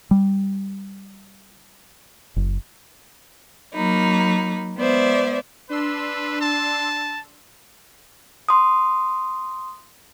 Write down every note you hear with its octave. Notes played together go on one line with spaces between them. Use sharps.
G3
F#1
F#3 A#3 D#4 B5
G#3 B3 C5 D5 E5
D4 B4 C6 E6
A5
C6 D#6